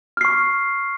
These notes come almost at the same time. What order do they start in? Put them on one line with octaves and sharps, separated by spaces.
F6 C7 C#6